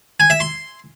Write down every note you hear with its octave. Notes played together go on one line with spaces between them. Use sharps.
G#5
E5
C6